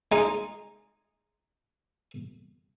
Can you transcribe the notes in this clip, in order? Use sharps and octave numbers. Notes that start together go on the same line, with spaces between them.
G#3 D#4